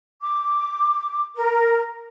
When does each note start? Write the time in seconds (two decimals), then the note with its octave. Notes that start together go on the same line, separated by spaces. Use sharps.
0.22 D6
1.36 A#4